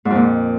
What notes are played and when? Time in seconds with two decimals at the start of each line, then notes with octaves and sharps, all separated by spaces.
0.05 G#2
0.10 F2
0.15 A#2